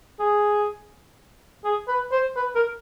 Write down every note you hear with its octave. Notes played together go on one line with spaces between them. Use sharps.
G#4
G#4
B4
C5
B4
A#4